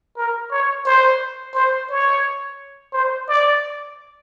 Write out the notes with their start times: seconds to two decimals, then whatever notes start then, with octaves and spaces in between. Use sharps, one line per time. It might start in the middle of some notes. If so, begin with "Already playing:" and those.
0.17 A#4
0.51 C#5
0.85 C5
1.54 C5
1.90 C#5
2.93 C5
3.28 D5